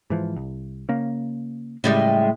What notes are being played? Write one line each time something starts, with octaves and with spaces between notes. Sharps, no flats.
G#2 E3 F3
C2
C#3 A#3
A2 C#3 G3 G#3